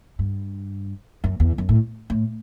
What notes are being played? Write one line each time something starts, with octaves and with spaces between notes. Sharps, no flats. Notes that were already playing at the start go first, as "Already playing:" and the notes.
G2
F#2
E2
F#2
A2
A2